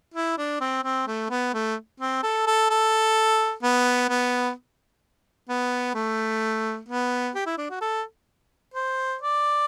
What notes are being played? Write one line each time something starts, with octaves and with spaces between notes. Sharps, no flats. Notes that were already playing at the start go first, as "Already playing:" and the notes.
E4
D4
C4
C4
A3
B3
A3
C4
A4
A4
A4
B3
B3
B3
A3
B3
G4
E4
D4
F#4
A4
C5
D5